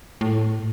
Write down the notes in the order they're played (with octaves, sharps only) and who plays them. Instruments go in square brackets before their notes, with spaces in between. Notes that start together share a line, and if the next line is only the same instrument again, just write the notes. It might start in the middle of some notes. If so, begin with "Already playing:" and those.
[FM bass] A2